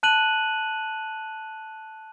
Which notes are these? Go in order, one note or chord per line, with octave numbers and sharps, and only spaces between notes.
A5 F#6 D#7 F#7